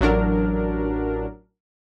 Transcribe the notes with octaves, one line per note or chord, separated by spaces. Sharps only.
A1 F#3 D4 A#4